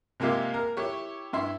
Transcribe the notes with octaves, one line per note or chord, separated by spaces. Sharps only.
C3 G#3 A#3 F4 G4 E5
A#4
E4 G4 C#5
G2 E4 E5 C6